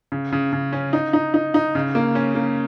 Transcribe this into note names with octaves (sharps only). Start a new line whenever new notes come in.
C#3
C#3
C#3
C#4
D#4
D#4
D#4
D#4
C#3
A#3
C#4
A#3